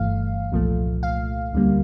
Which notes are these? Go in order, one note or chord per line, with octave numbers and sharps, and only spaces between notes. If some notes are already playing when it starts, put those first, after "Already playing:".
Already playing: G1 G2 E3 A3 F5
C2 A#2 F3 A3
F5
D2 D3 G3 A#3